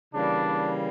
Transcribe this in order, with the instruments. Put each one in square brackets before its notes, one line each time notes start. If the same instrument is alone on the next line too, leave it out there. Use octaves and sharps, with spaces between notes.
[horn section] C#3 E3 G3 A#3 D4